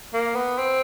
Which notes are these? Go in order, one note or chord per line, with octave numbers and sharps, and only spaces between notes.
A#3
B3
C4